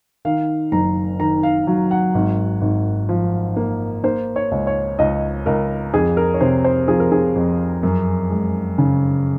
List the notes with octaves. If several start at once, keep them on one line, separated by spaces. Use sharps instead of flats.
D#3 F5
F#1 A#5
D#3 A#5
F5
F#3 F5
F#5
G#1
G#1
F3
A#3
A#3 C5
C#5
C#2
C#5
C#2 D#5
C#2 A#4
F2 G#4
A#4
C#5
C3 C5
C5
F3 G#4
A#4
G#4
F2
F#2
G#3
C#3